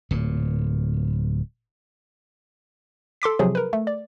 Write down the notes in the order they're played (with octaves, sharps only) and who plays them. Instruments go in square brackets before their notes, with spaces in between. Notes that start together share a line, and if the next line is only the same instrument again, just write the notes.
[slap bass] D1 A#2
[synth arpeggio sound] A4 C6 D6 B6
C3 F3 F#3 G#4
A#4 B4
A3
D5